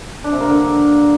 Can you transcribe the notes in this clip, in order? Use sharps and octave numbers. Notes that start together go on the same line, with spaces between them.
D4
C3
A#3
D3